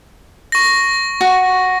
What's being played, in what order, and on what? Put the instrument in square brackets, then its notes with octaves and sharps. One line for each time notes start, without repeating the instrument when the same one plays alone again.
[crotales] C#6 A#6
[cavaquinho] F#4